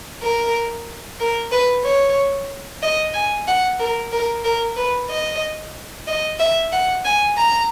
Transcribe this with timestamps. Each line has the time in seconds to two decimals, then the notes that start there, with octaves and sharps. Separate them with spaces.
0.22 A#4
1.20 A#4
1.52 B4
1.84 C#5
2.83 D#5
3.14 G#5
3.48 F#5
3.79 A#4
4.12 A#4
4.44 A#4
4.76 B4
5.10 D#5
6.07 D#5
6.39 E5
6.72 F#5
7.05 G#5
7.37 A#5